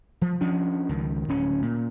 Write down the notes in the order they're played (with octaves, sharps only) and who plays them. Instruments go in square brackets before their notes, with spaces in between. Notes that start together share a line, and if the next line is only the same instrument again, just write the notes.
[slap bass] F3
F3 C#4 D4
C#2 D#3
D1 C#4
A#2